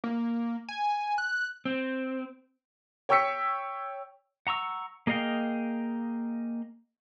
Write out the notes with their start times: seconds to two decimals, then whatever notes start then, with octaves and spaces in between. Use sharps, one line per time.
0.04 A#3
0.69 G#5
1.18 F#6
1.65 C4
3.09 C#5 G5 C#6 E6 B6 C#7
4.47 F#5 A#5 C#6 E6
5.07 A#3 G#4 D#5 F5 G5